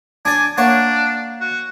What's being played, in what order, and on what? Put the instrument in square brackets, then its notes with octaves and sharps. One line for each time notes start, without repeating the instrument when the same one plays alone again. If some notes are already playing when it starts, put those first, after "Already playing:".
[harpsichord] D4 D5 [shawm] G#5
[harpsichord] A#3 C#5 F#5 [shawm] D4
[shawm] F#4